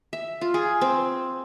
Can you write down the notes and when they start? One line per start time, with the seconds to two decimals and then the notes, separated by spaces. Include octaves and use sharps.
0.13 E5
0.41 F4
0.54 G#4
0.81 C4